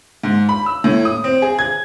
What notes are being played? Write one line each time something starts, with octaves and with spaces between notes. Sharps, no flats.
G#2
B5
E6
A2
D#6
C4
G#4
G#6